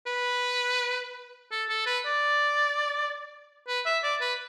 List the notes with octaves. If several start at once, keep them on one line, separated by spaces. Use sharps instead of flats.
B4
A4
A4
B4
D5
B4
E5
D5
B4